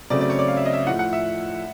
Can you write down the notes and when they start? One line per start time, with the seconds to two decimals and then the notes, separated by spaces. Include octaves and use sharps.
0.10 C#3 F#3 A3 C4 D5
0.21 D5
0.30 C#5
0.39 D5
0.48 F5
0.57 E5
0.65 D#5
0.74 E5
0.86 A2 F3 A3 F#5
0.99 F#5
1.13 E5